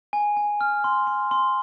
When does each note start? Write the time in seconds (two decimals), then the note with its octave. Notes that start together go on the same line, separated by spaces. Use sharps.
0.13 G#5
0.37 G#5
0.61 F6
0.84 C6
1.07 C6
1.31 C6